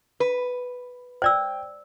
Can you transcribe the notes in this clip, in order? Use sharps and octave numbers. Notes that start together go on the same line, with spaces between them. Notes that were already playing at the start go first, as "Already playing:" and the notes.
B4
C5 D5 G5 E6